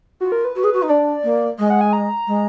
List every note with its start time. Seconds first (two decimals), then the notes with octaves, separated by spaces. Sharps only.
0.21 F4 F#4
0.32 A#4
0.45 B4
0.55 F#4
0.63 G#4
0.73 F#4
0.82 D#4
0.89 D4 D5
1.23 A#3
1.58 G#3 D#5
1.70 F#5
1.81 G#5
1.93 A#5
2.27 G#3